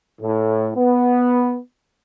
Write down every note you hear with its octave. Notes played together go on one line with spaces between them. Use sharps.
A2
B3